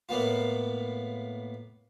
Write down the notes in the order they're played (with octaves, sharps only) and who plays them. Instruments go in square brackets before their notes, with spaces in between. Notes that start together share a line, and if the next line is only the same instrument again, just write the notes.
[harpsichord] A2 A#3 B3 F4